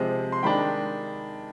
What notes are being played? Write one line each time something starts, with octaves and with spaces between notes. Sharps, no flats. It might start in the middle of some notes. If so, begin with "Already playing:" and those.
Already playing: C3 F3 G#3 C4
C6
D#3 G#3 D4 G5 B5